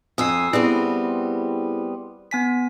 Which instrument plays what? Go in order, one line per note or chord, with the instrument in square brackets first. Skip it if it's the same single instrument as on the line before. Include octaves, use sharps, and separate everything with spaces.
[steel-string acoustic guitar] F2 G#5 [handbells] D#6 E6 C7
[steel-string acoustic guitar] G3 B3 C4 [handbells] E4 G#4
[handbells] B3 G#5 B6